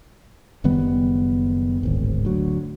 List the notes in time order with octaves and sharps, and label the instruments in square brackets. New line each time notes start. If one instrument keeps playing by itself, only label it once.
[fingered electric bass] F#1 D#3 G3 B3
D1 G#1
D2 F#3